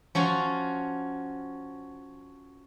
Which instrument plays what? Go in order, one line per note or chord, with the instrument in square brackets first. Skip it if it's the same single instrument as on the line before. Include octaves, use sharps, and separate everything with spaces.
[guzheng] F3 C#4 F#4